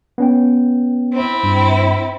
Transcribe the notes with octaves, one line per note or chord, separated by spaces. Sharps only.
B3 C#4 G5
C4 E4
G2